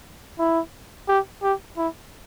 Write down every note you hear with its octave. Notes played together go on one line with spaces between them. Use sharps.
E4
G4
G4
E4